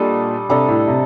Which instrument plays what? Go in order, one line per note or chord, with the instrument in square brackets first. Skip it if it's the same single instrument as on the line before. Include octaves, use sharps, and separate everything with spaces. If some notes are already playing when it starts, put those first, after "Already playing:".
Already playing: [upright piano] A#2 [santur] G3 D4 A4 D#5
[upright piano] C3 [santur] G3 D4 A4 D#5
[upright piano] A2
C3